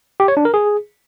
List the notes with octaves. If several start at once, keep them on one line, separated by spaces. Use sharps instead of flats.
G4
C#5
D4
A#4
G#4